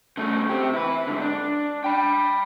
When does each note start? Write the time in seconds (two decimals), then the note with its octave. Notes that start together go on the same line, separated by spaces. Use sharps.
0.17 C#3 A3
0.49 C4 G4
0.74 E4 B4
1.07 G#2 D3
1.22 D4
1.84 G5 B5